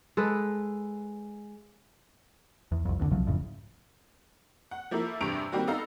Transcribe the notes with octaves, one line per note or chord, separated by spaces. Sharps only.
G#3 A4 B4
E2
C2 F2
E2 B2 D3
C2 C3 F3 F#3
F#1 F2 A2 C#3
F#5
F3 A#3 E4 A4 A#4
E2 G2 C3 C#6 D7 F7
D#3 G3 A#3 C4 F#4
B3 D#4 A4 F5 A#5